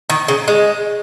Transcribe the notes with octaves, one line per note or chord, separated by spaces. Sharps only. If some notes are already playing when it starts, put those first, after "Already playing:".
D#3
C#3
G#3